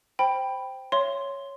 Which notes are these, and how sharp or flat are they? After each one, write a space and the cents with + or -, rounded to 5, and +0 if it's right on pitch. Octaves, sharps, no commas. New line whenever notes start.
C5 +0 G5 +0 B5 +0
C#5 +0 E5 +30 C6 +0